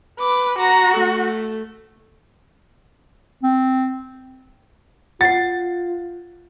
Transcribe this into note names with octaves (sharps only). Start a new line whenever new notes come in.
B4 D6
F#4 A#5
A3
C4
F4 F#5 A6 C7